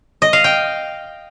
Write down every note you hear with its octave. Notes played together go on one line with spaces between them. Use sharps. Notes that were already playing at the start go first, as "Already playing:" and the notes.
D#5
F5
G5